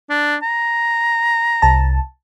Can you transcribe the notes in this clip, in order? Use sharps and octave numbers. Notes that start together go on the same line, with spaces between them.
D4
A#5
C2 A5